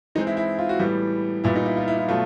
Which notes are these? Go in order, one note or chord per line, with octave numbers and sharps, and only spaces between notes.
E3 G#3 C4 D#4
E4
E4
F4
F#4
A2 E3 G3 B3
A#2 G3 B3 E4
D#4
E4
F4
E4
E4
B2 F#3 A3 F4